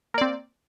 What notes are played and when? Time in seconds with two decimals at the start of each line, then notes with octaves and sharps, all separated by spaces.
0.14 A#3
0.18 D5
0.21 C4